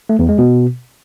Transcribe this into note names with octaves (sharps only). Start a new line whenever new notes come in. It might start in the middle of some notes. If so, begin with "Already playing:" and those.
A3
E2
G#3
B2